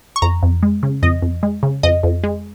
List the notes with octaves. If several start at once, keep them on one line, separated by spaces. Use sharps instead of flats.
C#6
F2 A#5
F2
G#3
C#3
F2 D#5
F2
G#3
C#3
F2 D#5
F2
G#3